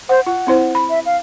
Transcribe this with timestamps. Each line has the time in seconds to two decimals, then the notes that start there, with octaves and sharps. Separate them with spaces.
0.09 C5 F#5
0.27 F4 F#5
0.47 C4 E4 C5
0.75 B5
0.90 E5
1.06 F5